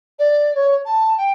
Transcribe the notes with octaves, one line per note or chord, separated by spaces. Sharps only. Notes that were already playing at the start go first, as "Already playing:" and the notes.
D5
C#5
A5
G5